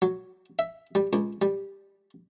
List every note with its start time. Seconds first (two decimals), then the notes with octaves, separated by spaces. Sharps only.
0.02 F#3
0.59 E5
0.95 G3
1.13 C#2
1.42 G3